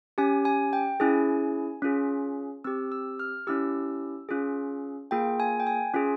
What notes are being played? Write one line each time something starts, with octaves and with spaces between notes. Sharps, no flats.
C#4 G4 G#5
G#5
G5
C#4 E4 G#4 G#5
C#4 F4 G#4
C4 G4 E6
E6
F6
C#4 E4 G4 E6
C#4 F4 G#4
A#3 F4 G#4 G5
G#5
G5
G#5
C#4 F4 G#4